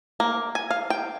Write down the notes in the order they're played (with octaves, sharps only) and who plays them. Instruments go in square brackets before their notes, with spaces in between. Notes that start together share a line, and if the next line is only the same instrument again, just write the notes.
[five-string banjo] A#3
G#5
F5
G5